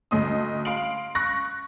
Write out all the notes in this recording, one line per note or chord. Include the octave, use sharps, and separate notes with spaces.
D2 A3 D#5 C6 D#6
F5 C6 D7 F#7
C#6 F#6 A#6